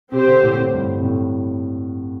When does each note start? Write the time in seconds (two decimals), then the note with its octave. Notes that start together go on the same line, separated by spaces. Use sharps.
0.12 C3 C4 G4 C5
0.27 D3
0.43 A2
0.58 A2
0.74 G2
0.99 C3
1.05 A2